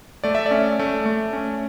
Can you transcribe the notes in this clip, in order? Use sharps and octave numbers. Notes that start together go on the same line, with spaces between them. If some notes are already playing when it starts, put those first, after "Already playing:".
A3 D5
E5
D5
C#4
A3
A3
C#4